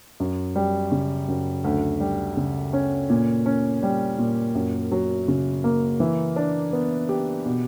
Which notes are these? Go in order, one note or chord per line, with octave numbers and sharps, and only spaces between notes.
F#2
G3
C#3
F#2
D2
G3
C#3
C#4
A#2
C#4
G3
A#2
F#2
F#3
C#3
A#3
E3
D4
B3
G4
B2